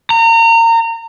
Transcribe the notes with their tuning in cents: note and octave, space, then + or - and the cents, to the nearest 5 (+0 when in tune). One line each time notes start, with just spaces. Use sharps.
A#5 -30